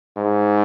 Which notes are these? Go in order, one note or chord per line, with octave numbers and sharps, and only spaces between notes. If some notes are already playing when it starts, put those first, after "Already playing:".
G#2